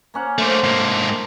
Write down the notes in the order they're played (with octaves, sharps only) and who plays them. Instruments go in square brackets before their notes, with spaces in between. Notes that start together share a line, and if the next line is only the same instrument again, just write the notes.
[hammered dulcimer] A#3 C#4 F#5
[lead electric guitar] A3 A#3 [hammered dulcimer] D4 C5 D6
[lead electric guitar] G#2 A#3